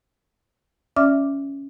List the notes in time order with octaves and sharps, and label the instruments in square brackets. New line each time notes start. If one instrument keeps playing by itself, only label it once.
[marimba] C#4 D5 E5 D6 F6